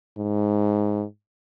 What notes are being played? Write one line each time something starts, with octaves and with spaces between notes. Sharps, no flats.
G#2